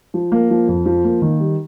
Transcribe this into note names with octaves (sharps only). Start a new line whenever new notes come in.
F3
A#3
F3
F2
F3
A#3
D#3
G3